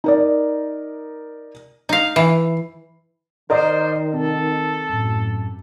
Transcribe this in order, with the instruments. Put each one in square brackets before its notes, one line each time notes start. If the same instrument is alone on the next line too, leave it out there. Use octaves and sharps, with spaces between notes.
[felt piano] D#4 A#4 D5
[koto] D#4 F5
[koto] E3 [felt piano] C7
[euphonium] D#3 [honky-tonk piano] A#4 D5 D#5 [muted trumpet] C5
[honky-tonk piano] C3 [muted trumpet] A4
[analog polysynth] F#2 A2